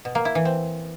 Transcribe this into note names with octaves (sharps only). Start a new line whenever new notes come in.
B2
A#3
E4
E3
C4